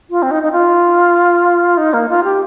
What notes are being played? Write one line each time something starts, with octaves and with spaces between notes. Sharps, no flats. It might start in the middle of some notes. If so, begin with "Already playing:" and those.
F4
C4
D#4
D#4
F4
D#4
A#3
F4
G4